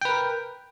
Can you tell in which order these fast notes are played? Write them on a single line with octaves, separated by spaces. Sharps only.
G5 B4 A#4